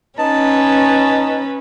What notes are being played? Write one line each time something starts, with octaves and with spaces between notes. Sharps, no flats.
C#4 D#4 B4 A5